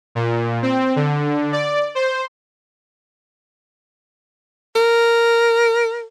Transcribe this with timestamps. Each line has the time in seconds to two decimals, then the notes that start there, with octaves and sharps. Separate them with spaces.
0.15 A#2
0.62 C4
0.96 D3
1.52 D5
1.95 C5
4.75 A#4